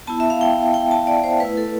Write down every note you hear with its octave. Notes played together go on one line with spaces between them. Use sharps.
B3 E4 A5
E5
F5
G5
G5
A5
D5
C5
A3 E4 B4
A4